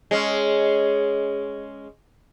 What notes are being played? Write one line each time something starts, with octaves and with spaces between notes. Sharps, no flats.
G#3 C#4